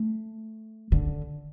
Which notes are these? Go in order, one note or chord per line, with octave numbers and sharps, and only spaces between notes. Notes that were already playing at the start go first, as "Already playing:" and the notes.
Already playing: A3
D3